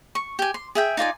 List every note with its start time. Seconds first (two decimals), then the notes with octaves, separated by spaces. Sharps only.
0.15 C#6
0.39 G4 G#5
0.54 C6
0.75 G#4 E5 G5
0.97 D#4 F4 D5 G#5